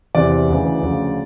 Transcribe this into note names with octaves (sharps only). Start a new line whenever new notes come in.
E2 C3 E3 D5
D2 C#3 E3
D2 C#3 F3